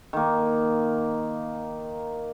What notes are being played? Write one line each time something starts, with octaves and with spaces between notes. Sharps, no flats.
D#3 A#3